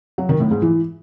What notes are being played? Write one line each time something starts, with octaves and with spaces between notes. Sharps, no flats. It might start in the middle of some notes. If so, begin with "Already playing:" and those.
F#3
D#3
A2
G#2
E3